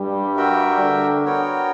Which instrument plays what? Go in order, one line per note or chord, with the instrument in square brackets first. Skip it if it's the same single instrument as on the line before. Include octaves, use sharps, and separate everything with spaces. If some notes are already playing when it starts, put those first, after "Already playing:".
Already playing: [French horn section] G2 G3
[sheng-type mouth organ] F#4 A#4 E5 G5
[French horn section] D3 D4
[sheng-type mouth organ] B3 F#4 A#4 C#5 G5